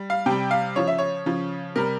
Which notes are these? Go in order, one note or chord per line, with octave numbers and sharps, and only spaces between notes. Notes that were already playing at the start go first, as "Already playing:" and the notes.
Already playing: G3
F5
C3 G3 G5
F5
C#3 F3 C#5
E5
C#5
C#3 F3
C3 G3 A#4